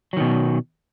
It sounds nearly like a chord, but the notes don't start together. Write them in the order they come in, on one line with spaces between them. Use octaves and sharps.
F#3 D#3 B2